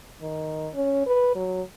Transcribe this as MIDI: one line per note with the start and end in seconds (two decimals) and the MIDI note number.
0.21 0.68 51
0.74 1.03 61
1.06 1.34 71
1.35 1.61 54